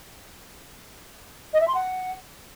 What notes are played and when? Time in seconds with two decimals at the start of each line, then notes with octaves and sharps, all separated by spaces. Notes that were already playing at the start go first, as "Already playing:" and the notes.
1.54 D#5
1.61 E5
1.68 C6
1.75 F#5